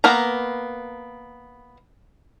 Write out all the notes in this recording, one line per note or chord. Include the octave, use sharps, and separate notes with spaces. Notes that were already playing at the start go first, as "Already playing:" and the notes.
A#3 B3 A#4 A#5